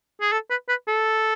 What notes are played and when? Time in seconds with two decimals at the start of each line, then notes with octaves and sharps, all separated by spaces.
0.21 G#4
0.32 A4
0.50 B4
0.69 B4
0.87 A4